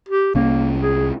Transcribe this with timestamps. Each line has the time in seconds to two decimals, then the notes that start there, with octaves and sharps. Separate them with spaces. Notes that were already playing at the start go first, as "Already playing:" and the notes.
0.09 G4
0.35 C2 A#3 C#4
0.80 G#4